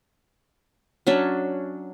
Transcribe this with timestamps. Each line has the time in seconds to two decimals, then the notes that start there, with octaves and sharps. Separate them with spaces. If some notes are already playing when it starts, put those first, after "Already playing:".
1.07 F#3 C#4 D4 E5